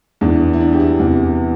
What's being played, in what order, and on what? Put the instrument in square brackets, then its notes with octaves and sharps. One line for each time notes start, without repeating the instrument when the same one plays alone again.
[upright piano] E2 E3 D4
E4
D4
G4
E4
E2 C3 E3